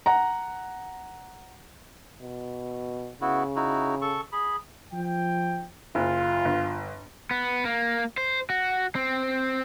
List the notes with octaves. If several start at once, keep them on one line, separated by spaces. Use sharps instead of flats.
F#5 A#5
B2
C#3 B3 E4 F#4
D#4 E4 F#4
A4 C#6
G#4 B5
F3 G5
F#1 F4
G1
B3
A#3
C5
F#4
C4